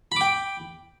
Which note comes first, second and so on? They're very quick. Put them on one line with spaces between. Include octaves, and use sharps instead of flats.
B5 D6 G5